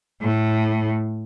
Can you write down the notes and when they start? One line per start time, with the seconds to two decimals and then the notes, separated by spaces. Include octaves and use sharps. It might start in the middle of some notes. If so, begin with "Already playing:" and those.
0.21 A2